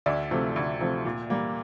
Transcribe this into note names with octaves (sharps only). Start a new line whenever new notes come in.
D2 D5 E5
C3 F3 A3
D2
C3 F3 A3
A#2
G3 A#3